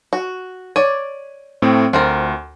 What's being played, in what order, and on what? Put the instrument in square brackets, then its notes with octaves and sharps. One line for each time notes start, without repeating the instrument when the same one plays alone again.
[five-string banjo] F#4
[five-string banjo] C#5 D5 [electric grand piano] D#7
[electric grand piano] A2 A3 C4
[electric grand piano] D2 [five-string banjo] C4 F4 A#4